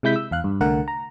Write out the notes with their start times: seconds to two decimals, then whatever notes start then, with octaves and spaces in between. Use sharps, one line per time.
0.03 C3 G#3 E4 G6 B6
0.16 E6
0.31 E2 F5 F#6
0.44 G2
0.60 C2 D3 A3 A#4 F#5
0.88 A#5